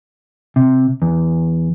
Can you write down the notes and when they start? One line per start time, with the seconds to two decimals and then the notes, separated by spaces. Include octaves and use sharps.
0.56 C3
1.02 E2